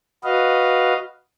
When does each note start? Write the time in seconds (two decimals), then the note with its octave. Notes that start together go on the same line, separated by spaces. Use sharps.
0.24 F#4 B4 D#5 F5